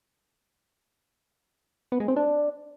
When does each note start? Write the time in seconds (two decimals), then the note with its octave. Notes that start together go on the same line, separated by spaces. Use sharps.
1.92 B3
2.00 G#3
2.08 C4
2.16 D4